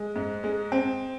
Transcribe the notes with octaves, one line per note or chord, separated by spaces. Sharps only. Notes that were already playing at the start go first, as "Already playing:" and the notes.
Already playing: G#3
G#2
G#3
C4